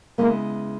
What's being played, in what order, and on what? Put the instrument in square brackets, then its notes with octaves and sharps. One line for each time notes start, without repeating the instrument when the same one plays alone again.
[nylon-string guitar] C#3 G#3 B3 E4 [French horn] A#3